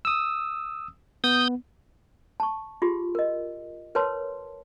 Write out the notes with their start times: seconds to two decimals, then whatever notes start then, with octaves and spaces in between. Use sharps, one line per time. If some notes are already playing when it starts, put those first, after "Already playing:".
0.05 D#6 E6
1.24 B3 D#6 G6
2.40 A5 C#6
2.82 F4 G4 G#4 C6
3.15 A#4 D#5
3.95 A#4 B4 C#5 A5 C6